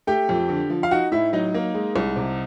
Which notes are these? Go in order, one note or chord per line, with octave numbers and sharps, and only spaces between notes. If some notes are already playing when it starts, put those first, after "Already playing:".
A3 G4 G5
F2
D3
F3
F5
D#4 F#4 F#5
A2 E4 E5
F#3 D#4 D#5
A#3
G#3
C2
C3